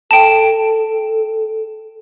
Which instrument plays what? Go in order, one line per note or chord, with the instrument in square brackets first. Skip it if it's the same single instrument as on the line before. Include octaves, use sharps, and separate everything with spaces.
[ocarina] A4 [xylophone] G5 A5